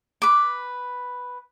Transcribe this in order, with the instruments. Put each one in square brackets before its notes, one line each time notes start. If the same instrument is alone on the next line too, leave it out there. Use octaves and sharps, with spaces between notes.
[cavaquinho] B4 D6